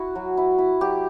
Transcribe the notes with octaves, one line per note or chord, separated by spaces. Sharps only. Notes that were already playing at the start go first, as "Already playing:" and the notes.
Already playing: E4 F#4
F#3
E4
E4
F#3 G4